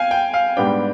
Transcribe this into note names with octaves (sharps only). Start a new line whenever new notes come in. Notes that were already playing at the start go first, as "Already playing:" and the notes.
Already playing: F5 G5 G#5
G5
F5
G#2 G3 B3 D4 G5